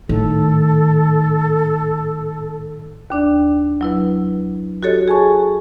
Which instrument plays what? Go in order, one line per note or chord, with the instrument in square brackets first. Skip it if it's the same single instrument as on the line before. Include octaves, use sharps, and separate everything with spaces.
[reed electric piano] A2 [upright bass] D#3 [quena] A4
[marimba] D#2 D4 D5
F#3 E4 B4
F#4 G4 A4 C#5 D#5
G#4 G#5 A5 C#6